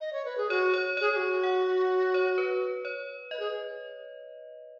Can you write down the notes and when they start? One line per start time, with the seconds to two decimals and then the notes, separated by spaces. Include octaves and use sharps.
0.01 D#5
0.13 C#5
0.25 B4
0.37 G#4
0.50 F#4 C#5
0.74 C#5
0.97 G#4 C#5
1.12 G#4
1.16 F#4
1.43 F#5
2.14 C#5
2.38 B4
2.85 C#5
3.31 B4 D#5
3.40 G#4